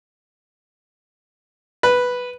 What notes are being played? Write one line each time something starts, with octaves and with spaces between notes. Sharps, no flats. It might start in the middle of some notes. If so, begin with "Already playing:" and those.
B4